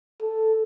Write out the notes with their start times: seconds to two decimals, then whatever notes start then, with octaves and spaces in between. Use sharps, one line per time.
0.21 A4